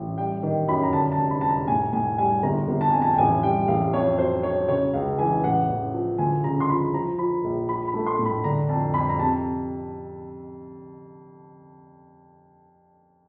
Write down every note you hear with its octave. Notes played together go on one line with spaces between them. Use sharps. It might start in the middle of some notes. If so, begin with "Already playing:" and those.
Already playing: A1
G3 G5
D#3
F#2 B5
A#5
D3 A5
A5
F1
B5
F1 A5
A#5
A2 G#5
A2 G#5
G3 G#5
G1 A#5
G1
A5
F2 G#5
A5
G5
A1 G#5
G3 G5
A1 F5
F2 C#5
F#3 C5
F#3 C#5
C#3 C#5
C#2 F5
E3 G#5
A1 F#5
A1
F3
D2 G#5
C#3 A#5
C6
F3 B5
F3 A#5
F3 B5
A#1
F3 B5
B5
A3
C6
A2
B5
D3 A#5
F2 A5
F2 B5
A#5
C3 A5